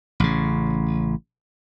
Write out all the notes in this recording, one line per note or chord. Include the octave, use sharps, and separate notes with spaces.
A1 C#3